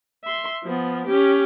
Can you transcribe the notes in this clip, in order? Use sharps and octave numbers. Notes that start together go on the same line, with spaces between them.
E5 C6
F3 B3
C#4 G4